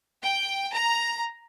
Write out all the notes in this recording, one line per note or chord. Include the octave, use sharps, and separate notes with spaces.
G5
A#5